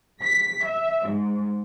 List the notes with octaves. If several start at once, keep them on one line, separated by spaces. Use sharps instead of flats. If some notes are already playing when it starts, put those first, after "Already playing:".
B6
E5
G#2